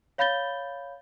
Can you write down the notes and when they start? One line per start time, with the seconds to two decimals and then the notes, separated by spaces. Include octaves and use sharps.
0.18 C#5 F5 B5 G6 A6 G7